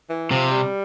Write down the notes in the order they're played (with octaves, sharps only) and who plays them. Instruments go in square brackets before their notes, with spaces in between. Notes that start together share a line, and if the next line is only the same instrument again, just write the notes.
[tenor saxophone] E3
[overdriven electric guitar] C3 [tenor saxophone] F3
[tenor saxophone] G3